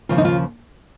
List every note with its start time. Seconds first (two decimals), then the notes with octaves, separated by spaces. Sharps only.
0.09 D#2 C#3 F3 F4
0.18 D#4
0.25 F4